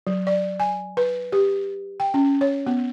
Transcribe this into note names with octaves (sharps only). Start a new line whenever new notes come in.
F#3
D5
G#5
B4
G4
G5
C#4
C#5
B3